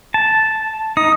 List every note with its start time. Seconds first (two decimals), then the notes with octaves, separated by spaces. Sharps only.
0.14 A5
0.97 D#4 D#6